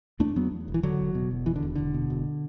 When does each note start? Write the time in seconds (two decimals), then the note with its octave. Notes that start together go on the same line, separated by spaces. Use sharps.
0.20 E2 A3 D4
0.36 E2 F#3 B3
0.51 E2
0.68 E1
0.74 E3
0.83 E1 D3 F#3
0.99 E1
1.15 B2
1.31 E1
1.46 E2 E3
1.56 D3
1.62 E1
1.75 E1 D3
1.94 B2
2.10 E1